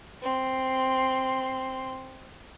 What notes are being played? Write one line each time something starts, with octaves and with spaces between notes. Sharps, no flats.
C4 C6